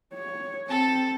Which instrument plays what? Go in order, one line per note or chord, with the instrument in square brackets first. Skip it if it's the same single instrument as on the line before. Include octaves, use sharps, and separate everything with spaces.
[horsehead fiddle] C#5
[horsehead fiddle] C4 [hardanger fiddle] A4 A5